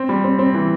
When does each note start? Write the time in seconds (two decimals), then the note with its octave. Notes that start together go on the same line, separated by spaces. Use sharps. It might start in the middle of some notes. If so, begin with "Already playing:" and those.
Already playing: C4
0.09 G3
0.24 C4
0.39 C4
0.54 E3